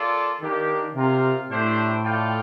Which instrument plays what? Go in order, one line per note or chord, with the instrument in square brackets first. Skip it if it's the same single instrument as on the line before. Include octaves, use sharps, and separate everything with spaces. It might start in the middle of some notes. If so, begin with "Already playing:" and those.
Already playing: [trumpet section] A#3 F4 A4 D5
[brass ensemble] D#3 [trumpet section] A#3 D4 G4
[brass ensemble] C3 [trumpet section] F4 A#4 F5
[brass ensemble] A2 [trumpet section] A3 D4 G4 C5
[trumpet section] F4 A4 D5 G5